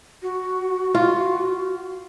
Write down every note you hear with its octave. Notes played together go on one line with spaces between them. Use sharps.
F#4
F4